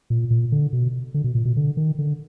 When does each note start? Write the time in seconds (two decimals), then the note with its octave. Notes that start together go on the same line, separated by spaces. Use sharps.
0.10 A#2
0.31 A#2
0.52 D3
0.73 B2
1.14 D3
1.24 B2
1.35 A#2
1.45 B2
1.57 D3
1.77 D#3
1.99 D3